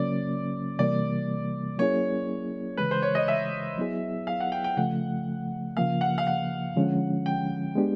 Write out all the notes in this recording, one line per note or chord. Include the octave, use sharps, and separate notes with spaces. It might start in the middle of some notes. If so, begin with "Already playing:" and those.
Already playing: C#3 F#3 A#3 C#4 D5
C3 E3 G3 A#3 D5
F#3 A#3 C#4 E4 G#4 C#5
C#3 E3 G#3 B4
C5
C#5
D#5
E5
F#3 B3 E4 G#4
F5
F#5
G5
G5
C#3 F3 A3 F#5
C#3 F3 A#3 F5
F#5
F5
F#5
D3 F3 G#3 C#4
G5
G#3 B3 D4 G4